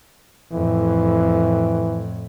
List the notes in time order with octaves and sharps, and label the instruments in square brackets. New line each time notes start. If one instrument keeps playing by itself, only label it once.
[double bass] F2 A2 [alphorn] E3